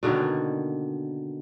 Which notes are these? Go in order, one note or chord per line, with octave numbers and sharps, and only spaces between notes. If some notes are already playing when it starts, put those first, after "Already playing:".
B2 D3 D#3 A#3